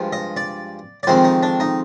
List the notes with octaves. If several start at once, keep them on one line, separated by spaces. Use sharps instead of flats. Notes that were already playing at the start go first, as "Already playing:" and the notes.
Already playing: G2 F3 G#3
D#5
D5
D5
F2 D#3 G#3 C4 C5
D#4
D4
D#4